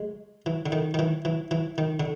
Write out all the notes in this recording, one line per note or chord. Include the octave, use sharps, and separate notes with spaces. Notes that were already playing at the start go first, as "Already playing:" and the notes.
Already playing: G#3
E3
D3
D#3
D#3
E3
E3
E3
D#3
D3